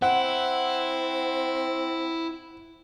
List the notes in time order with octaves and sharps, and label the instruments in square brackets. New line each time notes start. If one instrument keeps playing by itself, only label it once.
[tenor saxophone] C4 [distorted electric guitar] E4 [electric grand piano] F#5